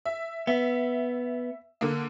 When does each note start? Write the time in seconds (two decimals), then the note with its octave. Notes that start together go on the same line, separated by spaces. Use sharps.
0.05 E5
0.47 B3 E5
1.81 D3 A#3